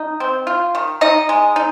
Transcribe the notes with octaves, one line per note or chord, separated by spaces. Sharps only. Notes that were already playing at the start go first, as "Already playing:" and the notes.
Already playing: D#4
C4
F4
D#3
D#4 D#5
G#3
D#4